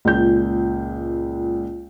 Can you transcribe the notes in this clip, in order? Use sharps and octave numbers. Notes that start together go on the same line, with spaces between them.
C#2 A#2 G6